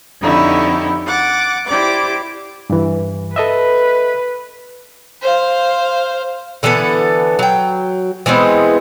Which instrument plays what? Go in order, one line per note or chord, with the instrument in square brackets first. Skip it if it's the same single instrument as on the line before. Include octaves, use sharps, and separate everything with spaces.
[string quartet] F2 D3 D#4 E4 G4 C#5
F#5 D6 A6
E4 G4 C5 D5 D6
[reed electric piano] G2 E3
[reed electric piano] A4 D#5 E5 [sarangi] B4
[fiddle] C5 F5
[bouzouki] D3 E3 B3 A4
F#3 G5
E3 G#3 B3 C4